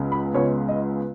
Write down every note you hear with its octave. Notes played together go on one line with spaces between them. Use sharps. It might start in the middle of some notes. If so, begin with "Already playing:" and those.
Already playing: C#2 C#3 G#3 B3
B5
C#2 C#3 G#3 B3 C#5
D#5